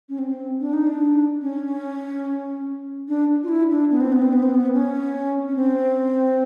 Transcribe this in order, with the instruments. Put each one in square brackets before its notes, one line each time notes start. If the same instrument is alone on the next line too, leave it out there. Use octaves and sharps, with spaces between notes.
[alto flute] C#4
C4
D4
D#4
D4
C#4
D4
F4
E4
D4
B3
C4
B3
C4
B3
C4
B3
C#4
C#4
C4